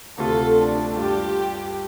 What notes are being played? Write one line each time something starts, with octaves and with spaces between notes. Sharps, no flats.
D2 C3 A3 F4 A4
D4
G2 G3 F4 G4